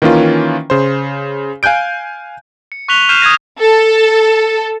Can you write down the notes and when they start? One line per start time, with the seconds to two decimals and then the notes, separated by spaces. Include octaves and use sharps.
0.02 D#3 E3 A#3 C#4 F4
0.70 C#3 C5
1.63 F5 G#5 F#6 G6 D7
2.72 C#7
2.88 C#6 F#6 B6 F7 G7
3.09 F6 G6 C7 D#7 E7
3.22 D#6 G#6 A#6
3.59 A4